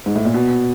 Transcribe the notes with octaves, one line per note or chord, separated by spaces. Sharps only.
G#2
A2
A#2
B2